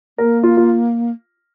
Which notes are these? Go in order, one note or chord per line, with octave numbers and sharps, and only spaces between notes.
A#3 A#4
F4
F4